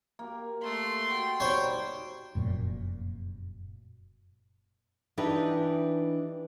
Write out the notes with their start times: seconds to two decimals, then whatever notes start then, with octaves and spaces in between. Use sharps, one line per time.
0.19 A#3 G4
0.64 A3 C6
1.10 F#4 G5
1.40 G3 D#4 C5 C#5
2.35 F1 F#2 A#2
5.18 E3 D4 D#4 G4 B4